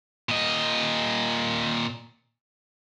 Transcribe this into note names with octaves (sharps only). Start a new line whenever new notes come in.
A#2 D#5